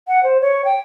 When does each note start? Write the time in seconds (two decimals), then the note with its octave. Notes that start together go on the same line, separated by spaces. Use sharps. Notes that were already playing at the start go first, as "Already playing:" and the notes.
0.08 F#5
0.24 C5
0.41 C#5
0.65 G5